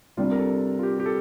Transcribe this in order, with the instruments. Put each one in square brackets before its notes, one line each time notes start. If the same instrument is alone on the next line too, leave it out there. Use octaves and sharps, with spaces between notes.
[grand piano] C3 G3 D4 [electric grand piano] F4
[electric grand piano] A#4
A4
F4
G4
G4
A4